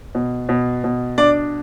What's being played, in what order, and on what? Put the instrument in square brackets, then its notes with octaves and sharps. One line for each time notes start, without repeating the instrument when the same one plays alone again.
[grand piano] B2
B2
B2
[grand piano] D4 [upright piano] D5